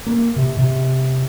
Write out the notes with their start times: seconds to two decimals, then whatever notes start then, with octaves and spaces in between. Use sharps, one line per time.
0.07 A#3
0.36 C3
0.57 C3